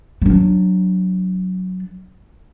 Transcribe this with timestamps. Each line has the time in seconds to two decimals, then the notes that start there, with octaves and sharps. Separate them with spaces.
0.22 F#3 D4